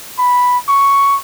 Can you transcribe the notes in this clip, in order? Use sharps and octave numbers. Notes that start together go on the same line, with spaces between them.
B5
C#6